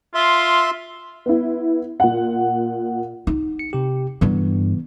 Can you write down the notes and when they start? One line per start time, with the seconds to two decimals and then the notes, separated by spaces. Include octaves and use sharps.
0.15 F4 E5 C6
1.26 B3 E4
2.00 A#2 F#5
3.27 D#4
3.59 C#7
3.73 C3 G4
4.21 G2 D3 E3 B3